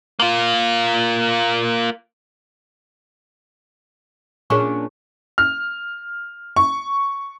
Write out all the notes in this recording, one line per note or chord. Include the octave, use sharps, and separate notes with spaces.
A#3 F4
A#2 C#4 D4 G#4 C#6
F6
C#6